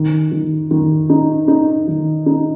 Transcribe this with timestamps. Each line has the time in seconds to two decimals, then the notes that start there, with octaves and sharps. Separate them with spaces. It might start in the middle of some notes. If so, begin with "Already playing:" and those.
Already playing: D#3
0.32 D#3
0.71 D#3
1.10 D#4
1.48 D#4
1.88 D#3
2.26 D#4